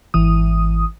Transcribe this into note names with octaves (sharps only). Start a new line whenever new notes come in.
G#1 E3 D#6